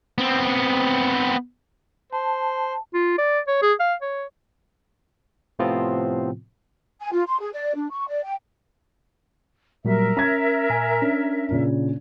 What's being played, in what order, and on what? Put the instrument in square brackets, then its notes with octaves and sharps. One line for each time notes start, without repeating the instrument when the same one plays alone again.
[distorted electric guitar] B3 C4
[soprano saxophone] C5 [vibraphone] A5
[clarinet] F4
D5
C#5
G#4
F5
C#5
[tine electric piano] A2 C3 F3 B3 C4 F4
[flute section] G#5
F4
C6
G#4
D5
D4
C#6
D5
G5
[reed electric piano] A#2 F#3 G3 [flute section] A#4 E5
[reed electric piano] C#4 [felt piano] A#5 G#6
[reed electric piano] A#2 G#5
C#4 D4
[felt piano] A#2 C#3